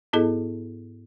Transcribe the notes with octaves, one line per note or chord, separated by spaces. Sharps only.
G#2 B3 E4 G#4 A4 D#5